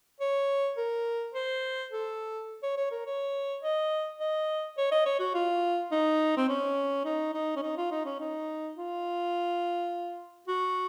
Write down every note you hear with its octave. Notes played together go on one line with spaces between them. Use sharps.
C#5
A#4
C5
A4
C#5
C#5
A#4
C#5
D#5
D#5
C#5
D#5
C#5
F#4
F4
D#4
C4
C#4
D#4
D#4
C#4
D#4
F4
D#4
C#4
D#4
F4
F#4